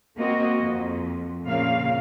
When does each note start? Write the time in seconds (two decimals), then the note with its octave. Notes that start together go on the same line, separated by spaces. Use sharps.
0.17 A#3 C4 F#4 D#5
0.60 F2
1.44 A#2 C#3 A#3 F5